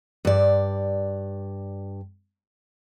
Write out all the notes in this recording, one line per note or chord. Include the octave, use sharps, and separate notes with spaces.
G2 D5